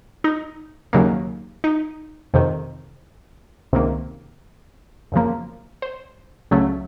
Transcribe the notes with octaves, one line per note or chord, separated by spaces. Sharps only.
D#4
D#2 C#3 F#3 A#3
D#4
F2 C3 D#3
C#2 C3 D#3 A#3
F#2 C#3 F3 A#3
C5
C#2 C#3 F#3 A3